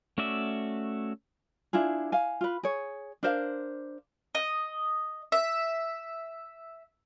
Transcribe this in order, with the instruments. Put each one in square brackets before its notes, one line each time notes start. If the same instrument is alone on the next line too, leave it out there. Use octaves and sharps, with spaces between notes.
[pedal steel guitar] A3 C#4 F#4 D5 E5
[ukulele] D4 E4 F4 G#4
F5 G#5
F4 B4
G#4 C#5
D4 A#4 C5 F5
[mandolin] D#5
E5